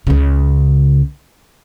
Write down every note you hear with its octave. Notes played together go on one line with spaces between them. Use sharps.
C#2 C#3